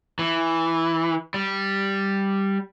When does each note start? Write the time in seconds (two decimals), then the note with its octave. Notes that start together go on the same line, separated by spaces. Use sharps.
0.19 E3
1.34 G3